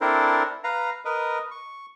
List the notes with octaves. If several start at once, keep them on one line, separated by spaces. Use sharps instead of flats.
C4 D4 E4 A4 A#4 C5
B4 F5 A#5
A#4 B4 D#5
C#6